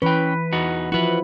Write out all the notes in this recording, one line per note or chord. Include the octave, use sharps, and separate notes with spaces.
E3 C#4 B4 G5
E2 D#4 F#4
F3 E4 F#4 B4